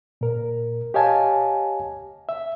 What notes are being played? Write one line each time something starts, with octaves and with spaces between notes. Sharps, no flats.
A#2 A#4
G4 C#5 D#5 F5 G#5 A5
E5